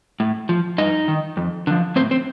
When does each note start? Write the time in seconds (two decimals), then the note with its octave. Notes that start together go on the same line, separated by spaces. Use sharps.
0.20 A2
0.49 F3
0.78 G2 D#4 D#5
1.08 D#3
1.37 F2
1.67 D3 F3
1.96 A2 C4 C5
2.11 C4 C5